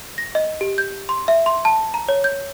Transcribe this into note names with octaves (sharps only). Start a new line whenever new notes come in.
A#6
D#5
G4
G6
C6
E5
C6
A5
A#5
C#5
G6